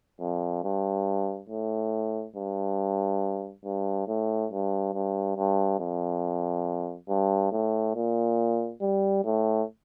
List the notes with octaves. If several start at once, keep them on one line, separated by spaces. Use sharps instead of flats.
F2
G2
A2
G2
G2
A2
G2
G2
G2
F2
G2
A2
A#2
G3
A2